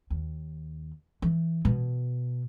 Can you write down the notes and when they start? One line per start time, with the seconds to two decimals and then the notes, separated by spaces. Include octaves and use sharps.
0.10 D#2
1.22 E3
1.65 B2